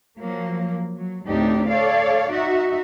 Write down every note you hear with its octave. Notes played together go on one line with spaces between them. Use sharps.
F3 F#3 A#3
F#3
D2 A2 C4 D4 D#4 G4
A4 C#5 D5 F5
D#4 F#4 E5